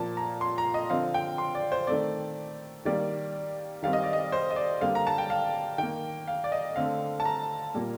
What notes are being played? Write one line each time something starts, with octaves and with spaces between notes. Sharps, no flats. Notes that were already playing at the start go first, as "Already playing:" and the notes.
Already playing: A#2 F3 A#3 A5
A#5
C6
A#5
D#5
D3 F3 C4 F5
G5
C6
D5
C5
D#3 A3 C4 D5
D#3 G3 A#3 D5
D#3 G3 C4 F5
D#5
D5
D#5
C5
D#5
D5
D3 G3 A#3 F5
A#5
A5
G5
F5
D#3 G5
A#3
F5
D5
D#5
D3 A3 C4 F5
A5
A#5
A#2 G3 A#3